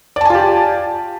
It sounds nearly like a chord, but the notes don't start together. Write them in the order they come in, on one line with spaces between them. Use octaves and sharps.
D5 A5 G#5 F4 G4